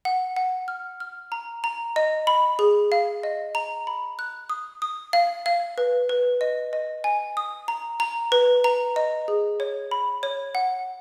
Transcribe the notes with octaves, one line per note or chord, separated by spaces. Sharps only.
F#5
F#5
F6
F6
A#5
A#5
D#5
B5
G#4
F5
D#5
A#5
B5
F#6
D#6
D#6
F5
F5
B4
B4
D#5
D#5
G#5
D#6
A#5
A#5
B4
A#5
D#5
G#4
C#5
B5
C#5
F#5